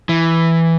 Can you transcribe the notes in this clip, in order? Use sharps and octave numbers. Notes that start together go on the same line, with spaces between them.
E3